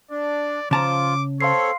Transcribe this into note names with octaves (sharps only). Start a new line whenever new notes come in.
D4 D5
C#3 F3 F4 A5 A#5 D6
C4 A4 C#5 F5 C6 C7